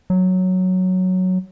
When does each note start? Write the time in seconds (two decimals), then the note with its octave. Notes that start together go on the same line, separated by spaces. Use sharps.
0.10 F#3